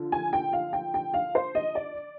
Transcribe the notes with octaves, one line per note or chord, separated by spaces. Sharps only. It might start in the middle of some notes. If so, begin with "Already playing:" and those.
Already playing: D3 F3
G#5
G5
F5
G5
G5
F5
C5
D#5
D5